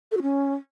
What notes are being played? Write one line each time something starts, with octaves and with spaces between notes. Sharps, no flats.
A4
F#4
C#4